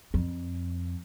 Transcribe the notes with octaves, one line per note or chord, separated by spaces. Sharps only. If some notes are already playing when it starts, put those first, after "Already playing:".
F2